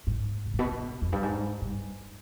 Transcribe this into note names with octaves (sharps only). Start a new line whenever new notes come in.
G#2
B2
G#2
B2
B2
F2
G2
G#2
G2